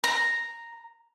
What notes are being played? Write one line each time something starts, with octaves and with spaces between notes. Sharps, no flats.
A#5